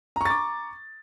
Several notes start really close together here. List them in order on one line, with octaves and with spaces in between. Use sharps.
A#5 C#6 A6 D6